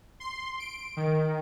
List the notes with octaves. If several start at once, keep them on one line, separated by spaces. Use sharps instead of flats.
C6
D7
D#3